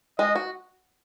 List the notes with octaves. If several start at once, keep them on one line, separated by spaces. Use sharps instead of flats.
G#3 D#5
F#4